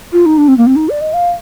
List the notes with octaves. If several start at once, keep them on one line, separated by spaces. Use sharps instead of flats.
F4
D#4
D4
C4
A#3
C4
D#4
D5
D#5
F5